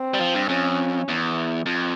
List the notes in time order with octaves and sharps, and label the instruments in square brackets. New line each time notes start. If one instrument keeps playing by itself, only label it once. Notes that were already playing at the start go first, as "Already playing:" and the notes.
Already playing: [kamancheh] C4
[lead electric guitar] G3
F3
G2
[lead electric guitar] F2 [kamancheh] C#4
[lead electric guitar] E2
F2